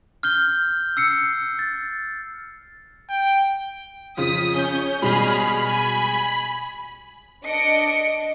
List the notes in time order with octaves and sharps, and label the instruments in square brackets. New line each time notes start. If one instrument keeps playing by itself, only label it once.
[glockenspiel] F6 G6 G7
E6 C7 C#7
A6
[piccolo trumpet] G5
[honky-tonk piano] F2 C#3 F3 [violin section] D#6 B6
[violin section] C#4 G6
[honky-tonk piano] B2 G3 G#3 [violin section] G#4 F6 [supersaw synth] B5
[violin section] G#5
D4 D#5 C#7 D7